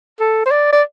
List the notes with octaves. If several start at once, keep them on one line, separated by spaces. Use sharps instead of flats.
A4
C5
D5
D5